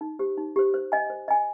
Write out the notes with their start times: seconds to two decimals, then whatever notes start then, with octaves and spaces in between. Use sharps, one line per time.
0.01 D#4
0.19 G4 C5
0.37 D#4
0.56 G4 C5
0.74 C5
0.92 D#5 G#5
1.10 C5
1.28 D#5 G#5